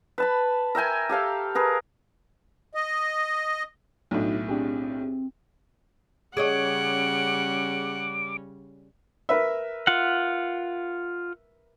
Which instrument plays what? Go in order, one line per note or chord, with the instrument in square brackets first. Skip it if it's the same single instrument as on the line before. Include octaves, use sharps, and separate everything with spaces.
[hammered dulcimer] B4 A5 B5
A#4 E5 G5 G#5
G4 A4 F5 G5
G#4 A#4 B4
[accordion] D#5
[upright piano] B1 A2 [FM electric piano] D4 D#4 F#4
[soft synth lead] C4 [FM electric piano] D4 G4 G#4
[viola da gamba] C#3 G3 C#4 [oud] G#4 C#5 D#5 [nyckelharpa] F#5 [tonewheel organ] D6
[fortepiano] A#4 B4 E5
[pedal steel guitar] F4 F#5